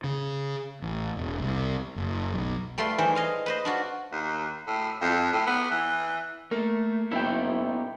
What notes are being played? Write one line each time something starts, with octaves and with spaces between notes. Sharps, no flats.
C#3
A1
E1
C2
F#1
B1
G3 A3 F4 B4 C6
E3 G3 G#3 C5
D#5 F5 G#5
B4 C5 D#5
D4 F4 F#4
D#2
A2
F2
A2
B3
E3
A3 A#3
F#1 B3 D#4 E4 A4 G5